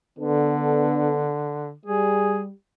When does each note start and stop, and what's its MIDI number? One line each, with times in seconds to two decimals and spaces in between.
0.19 1.72 50
0.19 1.29 59
0.19 1.29 62
0.19 1.29 69
1.86 2.48 55
1.86 2.41 68